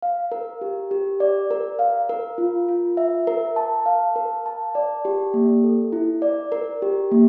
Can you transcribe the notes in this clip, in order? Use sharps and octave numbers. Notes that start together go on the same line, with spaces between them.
F5
A#4
G4
G4
D5
A#4
F5
A#4
F4
F4
E5
A#4
A5
F5
A#4
A5
D5
G4
A#3
A4
E4
D5
A#4
G4
A#3